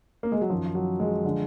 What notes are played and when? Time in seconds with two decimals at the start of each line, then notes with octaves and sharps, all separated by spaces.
0.23 A#3
0.32 G#3
0.41 F#3
0.50 F#2 D#3 F3
0.75 F#3
1.00 G#3
1.25 D3 F3